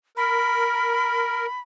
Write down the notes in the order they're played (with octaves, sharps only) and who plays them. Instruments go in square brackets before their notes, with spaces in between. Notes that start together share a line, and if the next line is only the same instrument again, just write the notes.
[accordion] A#4 [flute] B5